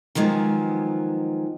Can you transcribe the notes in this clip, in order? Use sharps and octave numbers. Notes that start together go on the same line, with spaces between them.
D#3 F3 F#3 G#3 B3